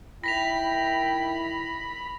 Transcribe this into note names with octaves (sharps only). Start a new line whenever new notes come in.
D#3 E4 G5 B5 A#6 B6 F7